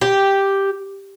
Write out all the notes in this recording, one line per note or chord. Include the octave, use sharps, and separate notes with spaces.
G4